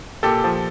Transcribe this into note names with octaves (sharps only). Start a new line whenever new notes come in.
A#2 G4 A4
F3